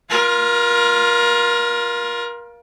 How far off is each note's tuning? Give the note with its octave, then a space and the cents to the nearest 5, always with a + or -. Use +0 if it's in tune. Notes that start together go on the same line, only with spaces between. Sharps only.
F4 +0 A#4 +30